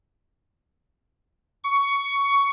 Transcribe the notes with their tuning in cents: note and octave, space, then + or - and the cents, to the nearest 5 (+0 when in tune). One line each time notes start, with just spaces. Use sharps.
C#6 +15